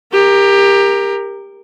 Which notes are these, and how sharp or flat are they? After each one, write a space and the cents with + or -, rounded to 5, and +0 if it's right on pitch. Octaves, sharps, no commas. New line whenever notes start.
G4 +20 A#4 +0